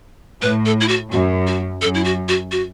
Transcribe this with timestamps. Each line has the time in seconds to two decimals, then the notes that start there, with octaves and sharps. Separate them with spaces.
0.41 A2 B4
0.65 A4
0.81 E4
0.88 F#4
1.12 F#2 F#4
1.47 F#4
1.82 F#2 A4
1.95 E4
2.04 F#4
2.28 F#4
2.52 F#4